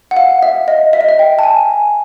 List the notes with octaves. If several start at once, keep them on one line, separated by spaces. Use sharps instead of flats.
F#5
F5
E5
D#5
E5
D#5
E5
G5
A5
G#5